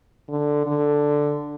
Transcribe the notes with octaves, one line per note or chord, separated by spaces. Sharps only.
D3
D3